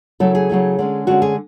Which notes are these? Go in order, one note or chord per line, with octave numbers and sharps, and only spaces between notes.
C#3 F#3 A3 E4 A4
G#4
C#3 F#3 A3 E4
D3 G#3 C#4
D3 G#3 C#4 F#4
G#4